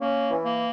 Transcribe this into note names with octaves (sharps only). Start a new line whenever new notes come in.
A#3 C#4
E3
A#3